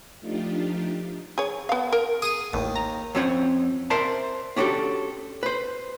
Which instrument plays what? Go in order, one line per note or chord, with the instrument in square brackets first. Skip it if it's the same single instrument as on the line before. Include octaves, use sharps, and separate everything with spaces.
[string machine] F3 A3 D4 D#4 F4 G4
[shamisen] G#4 C#5
B3 F5
A#4
[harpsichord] G#4 [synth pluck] D#6 D#7
[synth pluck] A1 [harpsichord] D#2
[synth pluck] A#5
[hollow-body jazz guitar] F2 C4 C#4 C5 C#5 F#5
A#4 C5 D5 E5 A5
C#4 D4 F#4 G4 A4
B4 C5